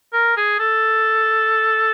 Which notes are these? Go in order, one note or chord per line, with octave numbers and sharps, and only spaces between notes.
A#4
G#4
A4